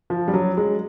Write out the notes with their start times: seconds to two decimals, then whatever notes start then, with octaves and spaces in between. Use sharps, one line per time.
0.10 F3
0.28 G3
0.34 F#3
0.57 G#3